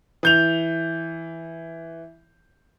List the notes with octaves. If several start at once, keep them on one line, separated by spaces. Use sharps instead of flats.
E3 G6 F7